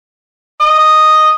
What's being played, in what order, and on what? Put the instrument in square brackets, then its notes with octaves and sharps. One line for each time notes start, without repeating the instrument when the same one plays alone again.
[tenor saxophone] D#5